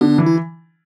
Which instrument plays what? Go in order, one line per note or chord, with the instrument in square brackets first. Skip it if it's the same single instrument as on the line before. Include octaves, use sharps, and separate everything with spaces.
[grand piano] D3 [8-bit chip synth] B3 D4
[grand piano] E3
[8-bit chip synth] E4